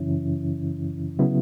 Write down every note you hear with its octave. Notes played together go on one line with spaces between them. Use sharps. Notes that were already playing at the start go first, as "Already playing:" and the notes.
Already playing: F#2 C#3 E3 C#4 E4
C#3 F#3 B3 E4